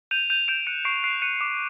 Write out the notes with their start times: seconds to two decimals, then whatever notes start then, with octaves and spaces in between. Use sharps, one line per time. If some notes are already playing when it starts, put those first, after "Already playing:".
0.11 G6 D#7 F7
0.30 G6 D#7 F7
0.48 G6 D7 E7
0.67 F#6 C#7 D#7
0.85 C#6 C7 D7
1.04 F#6 C7 D7
1.22 F#6 C#7 D#7
1.41 D6